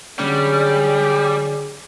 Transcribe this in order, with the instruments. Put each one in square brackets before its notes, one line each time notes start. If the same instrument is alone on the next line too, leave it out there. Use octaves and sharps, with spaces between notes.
[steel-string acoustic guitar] D3 F#3 C#4 [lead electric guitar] G3 [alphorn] G#4